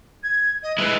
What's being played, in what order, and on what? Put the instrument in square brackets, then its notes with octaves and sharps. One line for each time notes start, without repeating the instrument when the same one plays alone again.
[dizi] G#6
D#5
[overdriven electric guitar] G#3 E4 [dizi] B4